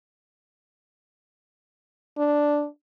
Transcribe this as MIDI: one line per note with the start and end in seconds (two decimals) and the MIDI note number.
2.18 2.66 62